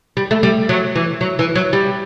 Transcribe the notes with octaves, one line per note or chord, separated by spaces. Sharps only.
G3
A3
G3
F#3
E3
F#3
E3
F#3
G3